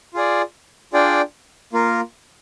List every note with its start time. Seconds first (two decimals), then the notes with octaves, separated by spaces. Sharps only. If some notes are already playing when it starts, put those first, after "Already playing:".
0.14 F4 G#4 D5
0.93 D4 F4 G#4 D5 G5
1.73 A#3 F4 A#4